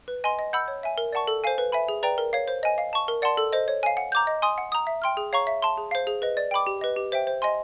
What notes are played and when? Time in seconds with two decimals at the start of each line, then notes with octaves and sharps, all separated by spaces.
0.08 B4
0.24 D#5 G#5 C6
0.39 D#5
0.53 F#5 B5 E6 G6
0.68 C#5
0.83 E5 G#5
0.98 A#4
1.13 D5 F#5 A5 C#6
1.27 A4
1.44 C5 F5 G#5
1.58 B4
1.72 E5 G#5 B5
1.89 G#4
2.03 B4 D5 G5 A#5
2.18 A#4
2.33 C#5 F5
2.48 C5
2.63 D#5 G#5
2.78 F5
2.93 A5 C#6
3.08 A#4
3.22 D5 F#5 A5 C6
3.37 A4
3.53 C5 D#5
3.68 C#5
3.83 F5 G#5
3.97 F#5
4.12 A#5 D6 G6
4.27 D#5
4.42 G#5 C6 D#6
4.58 F#5
4.72 A#5 D#6
4.87 E5
5.02 G5 C6 F6
5.17 G#4
5.33 C#5 F5 A#5 C#6
5.47 E5
5.62 A5 C6
5.78 G#4
5.91 C5 F5
6.07 G#4
6.22 B4 D#5
6.37 D5
6.51 G5 B5 D6
6.67 G4
6.81 B4 D#5
6.96 G4
7.12 C5 E5 G5
7.27 C5
7.42 D#5 G#5 C6